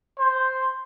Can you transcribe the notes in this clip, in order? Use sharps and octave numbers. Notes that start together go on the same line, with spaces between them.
C5